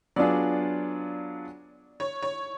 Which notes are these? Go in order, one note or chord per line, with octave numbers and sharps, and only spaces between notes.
F#3 B3 D4 F4 G#4 D5
C#5
C#5